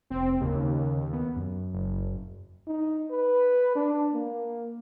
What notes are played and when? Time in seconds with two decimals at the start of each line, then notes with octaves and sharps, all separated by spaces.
0.10 F1 C4
0.41 D#2 C#3
1.13 B3
1.36 F#2
1.74 F#1
2.67 D#4
3.11 B4
3.75 D4
4.13 A#3